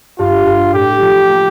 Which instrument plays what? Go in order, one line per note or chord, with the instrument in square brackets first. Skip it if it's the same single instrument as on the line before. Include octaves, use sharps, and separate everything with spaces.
[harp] G2 [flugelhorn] F4
[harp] G2
[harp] A2 [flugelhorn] G4
[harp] F3 G3
A#3